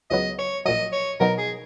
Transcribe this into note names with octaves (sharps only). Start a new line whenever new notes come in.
C#2 C#3 F#3 B3 D#5
C#5
A#1 A#2 F#3 D#5
C#5
B2 F#3 B3 D#4 A#4
G#4